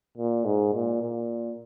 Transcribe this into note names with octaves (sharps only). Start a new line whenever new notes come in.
A#2
G#2
A#2
A#2